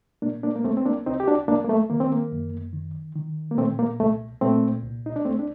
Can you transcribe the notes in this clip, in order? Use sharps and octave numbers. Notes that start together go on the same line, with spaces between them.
A#2 A#3 D4
A#3 D4
A#3
C2 A3 C4
C4
A#3 D4
C2 C4 D#4
G4
D4 F#4
C2 A#3 D4
A#3
A3
D#3 A#3
C4
A#3
F#2
D#3
D#3
A#3
A#2 A3 C4
A#3
C2 A3
A#2 A3 C4
C2
D#4
D4
C2 A3 C4
D4